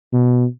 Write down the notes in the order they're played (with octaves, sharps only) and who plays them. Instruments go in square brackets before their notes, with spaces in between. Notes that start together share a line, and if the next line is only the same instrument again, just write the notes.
[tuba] B2